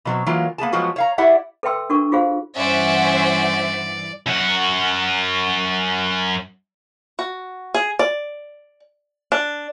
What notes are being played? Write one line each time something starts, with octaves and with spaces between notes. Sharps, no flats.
B2 F#3 C4
E3 F#3 G#3 A#3 F4
A#3 B3 G#4 A5
F3 F#3 G#3 B3 F4 F#4
C#5 F5 A#5
E4 G4 D5 E5 F#5
A4 B4 E5 G5 C6 E6
D4 F#4 A4 A#4 C#6
F4 F#4 G#4 C5 F5
G2 E3 C#4 C5 D5 E5 F#5
F#2 F#4
F#4
G#4
D5
D4